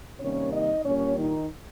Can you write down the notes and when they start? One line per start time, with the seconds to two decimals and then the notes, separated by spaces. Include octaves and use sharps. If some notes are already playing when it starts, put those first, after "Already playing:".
0.20 C3 D#3 G3 A#3 C#4 C#5
0.52 D#4 D#5
0.84 A#2 G3 A#3 C#4 C#5
1.17 D#3 D#4